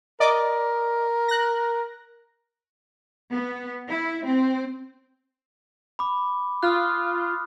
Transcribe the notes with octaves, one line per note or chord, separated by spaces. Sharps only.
A#4 D5 D#5 D6
F#6 A#6
B3
E4
C4
B5 D6
F4 D#6 F6 F#6